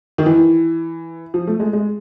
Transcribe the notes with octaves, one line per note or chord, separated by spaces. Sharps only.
D#3
E3
F3
A3
G#3
G#3